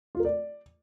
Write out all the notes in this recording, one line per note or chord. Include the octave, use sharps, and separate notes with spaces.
F4
A#4
D5